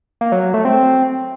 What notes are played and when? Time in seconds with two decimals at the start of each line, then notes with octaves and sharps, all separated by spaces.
0.21 A#3
0.32 F#3
0.43 F#3
0.54 A3
0.65 C4